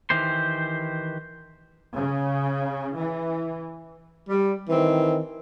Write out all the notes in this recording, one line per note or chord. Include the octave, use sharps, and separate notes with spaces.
D#3 E3 G4 C5 C6
C#3
E3
G3
D#3 E3 C4